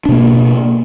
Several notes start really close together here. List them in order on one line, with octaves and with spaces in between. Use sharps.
D4 B2 A#3